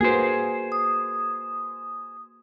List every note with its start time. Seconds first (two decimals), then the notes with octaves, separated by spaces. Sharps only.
0.01 A#3 F#4 G#4 B4 C5
0.72 D#6